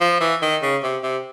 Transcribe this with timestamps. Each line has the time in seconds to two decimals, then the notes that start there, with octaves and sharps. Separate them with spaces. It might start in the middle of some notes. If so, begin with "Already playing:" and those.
0.01 F3
0.21 E3
0.42 D#3
0.62 C#3
0.83 C3
1.03 C3